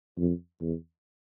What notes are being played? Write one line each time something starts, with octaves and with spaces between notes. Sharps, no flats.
F2
E2